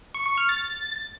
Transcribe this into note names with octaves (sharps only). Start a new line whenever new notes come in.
C#6
C#6
F6
A6